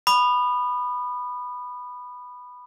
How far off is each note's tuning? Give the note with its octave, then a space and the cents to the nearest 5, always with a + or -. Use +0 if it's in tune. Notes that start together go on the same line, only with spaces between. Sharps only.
B5 +0 D#6 -35